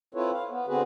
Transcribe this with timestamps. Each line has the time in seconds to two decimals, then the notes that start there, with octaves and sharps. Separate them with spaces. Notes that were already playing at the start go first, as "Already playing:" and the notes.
0.14 C4 E4 F4 A4 B4 C#5
0.33 F5
0.50 B3
0.67 D3 C4 F#4 G#4 B4